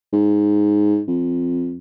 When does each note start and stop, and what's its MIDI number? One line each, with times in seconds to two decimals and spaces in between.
0.13 1.01 44
1.08 1.78 41